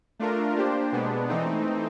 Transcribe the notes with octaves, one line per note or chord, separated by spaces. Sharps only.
A3 D4 F4 A#4
A#3 D4 G4 C5
B2 G#3 B3 D4
E3 A3 C4 D#4